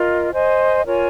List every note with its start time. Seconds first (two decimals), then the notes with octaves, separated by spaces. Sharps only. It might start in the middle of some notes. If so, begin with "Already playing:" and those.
Already playing: F4 A#4 D#5
0.32 C5 D#5 G#5
0.84 F4 A#4 C#5 G#5